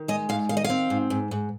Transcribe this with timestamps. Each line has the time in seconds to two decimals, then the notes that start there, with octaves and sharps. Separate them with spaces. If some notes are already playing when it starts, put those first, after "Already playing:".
Already playing: D#3
0.08 G#3 D#5
0.29 G#2 F5
0.49 D#3 F5
0.57 D#5
0.64 F5
0.70 C4
0.90 G#2
1.10 G#2
1.31 G#2